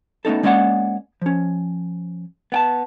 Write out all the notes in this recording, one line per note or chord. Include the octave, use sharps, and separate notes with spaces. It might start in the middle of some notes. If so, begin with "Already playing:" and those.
A3 B3 C#4 D#4 A4
G#3 A#3 C#4 D5 D#5 F#5
F3 C#4
B3 G5 A5